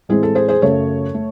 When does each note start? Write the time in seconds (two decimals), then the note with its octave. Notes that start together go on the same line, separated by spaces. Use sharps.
0.09 A2 E3 G#3 C4 G#4
0.23 A4
0.35 G#4 C5
0.48 G#4 C5
0.62 F#2 C#3 F#3 A3 A4 C#5
1.14 A3